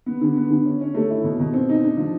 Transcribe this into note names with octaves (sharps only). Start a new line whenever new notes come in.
B3
D3
B3
D3
C#4
C#4
A3
E4
B2
B2
C4
D#4
D4
F3